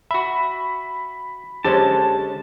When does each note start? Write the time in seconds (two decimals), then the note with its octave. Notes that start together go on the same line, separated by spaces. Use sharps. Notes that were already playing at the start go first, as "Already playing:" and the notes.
0.11 F#4 E5 B5
1.64 D3 G#3 C#4 G4 C5 C#5 A5